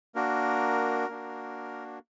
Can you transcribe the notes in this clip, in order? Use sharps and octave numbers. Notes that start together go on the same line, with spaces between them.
A#3 D4 F#4 A#4
A#3 D4 F#4